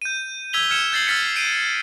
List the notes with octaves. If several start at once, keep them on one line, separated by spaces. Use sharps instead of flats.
G6 D#7
E6 G#6 B6 F7 G7
E6 F6 G#6 C#7 E7
G6 A6 C7 F#7
E6 F6 A6 B6 C#7
G6 C7 D7 D#7